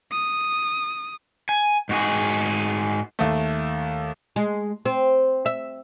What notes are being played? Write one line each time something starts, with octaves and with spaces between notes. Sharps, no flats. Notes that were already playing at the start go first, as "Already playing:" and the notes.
D#6
G#5
G#2 F#4 G#4
D#2 A3
G#3
C4
E5